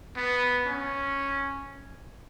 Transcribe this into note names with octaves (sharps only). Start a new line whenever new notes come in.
B3
C#4